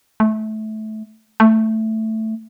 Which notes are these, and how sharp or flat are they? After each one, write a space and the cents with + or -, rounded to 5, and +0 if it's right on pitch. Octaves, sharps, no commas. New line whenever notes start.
A3 -20
A3 +5